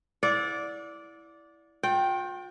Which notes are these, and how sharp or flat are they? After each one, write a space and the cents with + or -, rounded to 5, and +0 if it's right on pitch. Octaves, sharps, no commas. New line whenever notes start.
E4 +0 D5 -10 F#5 -40
F4 +45 G5 -5